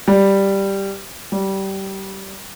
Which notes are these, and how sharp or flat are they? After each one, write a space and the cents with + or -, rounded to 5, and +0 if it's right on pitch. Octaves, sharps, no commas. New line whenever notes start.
G3 +0
G3 -20